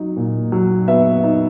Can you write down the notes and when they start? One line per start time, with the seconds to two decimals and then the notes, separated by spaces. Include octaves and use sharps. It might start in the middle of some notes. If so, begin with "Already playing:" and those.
Already playing: F#3 D#4
0.16 A#2
0.52 F#3
0.88 B3 E5
1.24 D#4